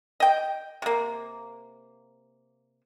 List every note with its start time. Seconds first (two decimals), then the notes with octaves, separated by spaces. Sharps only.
0.20 D#5 G5
0.82 C3 A#3